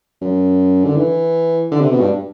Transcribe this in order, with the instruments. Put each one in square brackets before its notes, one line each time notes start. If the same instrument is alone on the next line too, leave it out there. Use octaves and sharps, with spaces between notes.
[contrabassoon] F#2
D3
E3
D3
C3
B2
G2